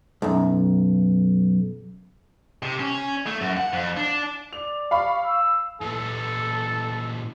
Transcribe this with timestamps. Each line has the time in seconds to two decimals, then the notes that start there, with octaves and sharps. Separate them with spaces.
0.22 B1 F#2
2.63 C3
2.79 C#4
3.26 A3
3.41 F#2
3.57 F#5
3.73 F2
3.97 D4
4.53 D5 F7
4.91 F5 B5 C#6
5.26 E6
5.82 A#2 E3 A4